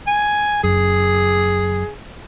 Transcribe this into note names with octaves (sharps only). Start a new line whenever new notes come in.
G#5
F#1 F#2 G#4